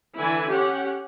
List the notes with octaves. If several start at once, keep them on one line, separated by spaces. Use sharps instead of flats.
D3 E3 E4 G#5
C#4 G4 F#5